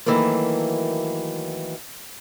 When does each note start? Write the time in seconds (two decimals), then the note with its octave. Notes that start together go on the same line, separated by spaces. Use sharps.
0.06 D#3 E3 F#3 A3 A#3